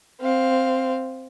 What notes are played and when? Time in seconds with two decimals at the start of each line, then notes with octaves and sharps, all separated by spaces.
0.21 C4 F5